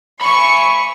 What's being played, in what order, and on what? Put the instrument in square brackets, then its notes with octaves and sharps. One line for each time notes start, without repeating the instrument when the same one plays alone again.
[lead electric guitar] G#5 B5 [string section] C#6